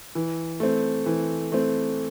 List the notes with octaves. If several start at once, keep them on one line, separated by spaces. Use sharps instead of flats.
E3
A3 C4
E3
A3 C4